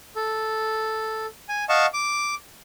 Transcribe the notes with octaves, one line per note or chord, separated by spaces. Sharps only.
A4
G#5
D#5 F5 F#5 A5 C#6
D6